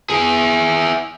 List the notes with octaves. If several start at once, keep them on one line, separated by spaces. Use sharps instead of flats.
E4 G#4